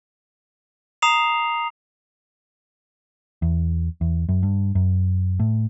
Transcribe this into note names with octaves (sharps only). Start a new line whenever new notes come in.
A#5 D#6 C7 F7
E2
E2
F#2
G2
F#2
A2